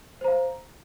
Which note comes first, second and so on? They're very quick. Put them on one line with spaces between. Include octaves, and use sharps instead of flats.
C5 A#5 F5